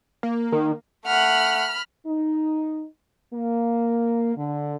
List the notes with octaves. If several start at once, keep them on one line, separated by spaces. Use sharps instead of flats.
A#3
D#3
A3 F#5 B5 F6
D#4
A#3
D3